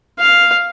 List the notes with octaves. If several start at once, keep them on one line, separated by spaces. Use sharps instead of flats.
F5